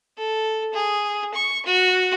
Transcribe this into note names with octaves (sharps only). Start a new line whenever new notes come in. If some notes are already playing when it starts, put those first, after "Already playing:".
A4
G#4
C#6
F#4